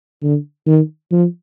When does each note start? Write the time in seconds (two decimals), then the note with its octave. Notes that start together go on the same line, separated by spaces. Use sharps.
0.23 D3
0.67 D#3
1.12 F3